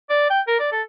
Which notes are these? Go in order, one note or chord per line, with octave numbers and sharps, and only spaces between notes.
D5
G5
A#4
D5
A4